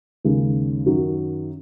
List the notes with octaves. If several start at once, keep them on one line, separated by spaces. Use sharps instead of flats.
D#2 C#3 G#3
F#2 D#3 F#3